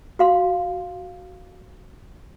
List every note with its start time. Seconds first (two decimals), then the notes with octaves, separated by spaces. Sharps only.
0.19 F#4 F5 C6